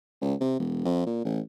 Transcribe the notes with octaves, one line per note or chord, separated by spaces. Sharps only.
C#2
C3
E1
F2
A#2
A1